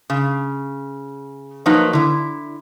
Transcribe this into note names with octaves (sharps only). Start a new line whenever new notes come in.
C#3
F3 F#3 A#3 D#4 B4
D3 E4